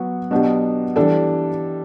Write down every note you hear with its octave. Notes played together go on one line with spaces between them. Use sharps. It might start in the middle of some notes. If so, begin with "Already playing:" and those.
Already playing: F#3 B3 F#4
B2 F#3 B3 D4 G4
E3 G3 D4 A4 D5